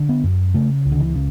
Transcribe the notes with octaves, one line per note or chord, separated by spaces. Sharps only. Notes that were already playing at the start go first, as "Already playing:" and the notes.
Already playing: D3
B3
F#2
C#3 A3
C#2
D3
E3
C#3